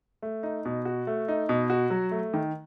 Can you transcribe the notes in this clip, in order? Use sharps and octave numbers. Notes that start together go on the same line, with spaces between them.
A3
D#4
B2
F#4
A3
D#4
B2
F#4
F#3
A3
D#3